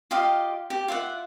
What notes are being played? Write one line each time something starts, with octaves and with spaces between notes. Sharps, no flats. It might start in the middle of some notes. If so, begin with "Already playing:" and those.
F4 G4 D#5 F5
G4
F4 D5 E5 F#5